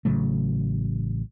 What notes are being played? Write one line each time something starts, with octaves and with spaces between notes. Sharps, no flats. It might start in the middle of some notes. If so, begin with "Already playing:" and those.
A1 C#3 F#3 A3